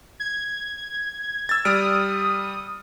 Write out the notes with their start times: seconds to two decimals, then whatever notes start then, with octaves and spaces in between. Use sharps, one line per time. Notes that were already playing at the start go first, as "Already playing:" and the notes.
0.20 G#6
1.49 E6 A6
1.65 G3 D#6 F6 D7